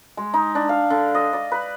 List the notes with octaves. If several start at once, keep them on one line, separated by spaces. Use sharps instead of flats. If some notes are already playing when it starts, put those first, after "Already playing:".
G#3
D#4
D4
F5
D3
D#5
D5
B4